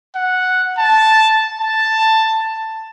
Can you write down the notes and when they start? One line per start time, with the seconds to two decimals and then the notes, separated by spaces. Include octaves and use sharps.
0.16 F#5
0.78 A5
1.61 A5